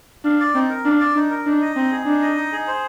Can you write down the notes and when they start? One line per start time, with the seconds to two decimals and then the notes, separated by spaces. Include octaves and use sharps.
0.24 D4 F5
0.40 D5
0.55 C4 D#4
0.70 A#4
0.85 D4 F5
1.00 D5
1.15 D4 D#4
1.30 A#4
1.46 D4 D#4
1.61 D#5
1.76 C4 D#4
1.91 G#4
2.06 D4 D#4
2.22 D#5
2.36 D#4
2.52 G#4
2.67 C5